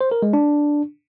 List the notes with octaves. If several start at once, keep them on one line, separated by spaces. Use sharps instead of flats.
C5
A#4
G#3
D4